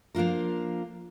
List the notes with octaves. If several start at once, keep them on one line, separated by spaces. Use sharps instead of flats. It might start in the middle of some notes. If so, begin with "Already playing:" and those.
F3 A#3 D4 F4 A#4